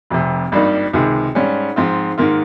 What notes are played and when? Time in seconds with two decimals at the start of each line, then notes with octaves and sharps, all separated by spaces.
0.10 F1 F2 C3
0.52 G#1 G2 G3 A#3 D#4
0.93 C#2 C3 D#3 G#3
1.35 G#2 G3 C#4
1.76 G#2 F3 C4 F4
2.18 G#2 D#3 A#3 F4